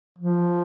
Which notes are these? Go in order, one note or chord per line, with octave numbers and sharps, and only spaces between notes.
F3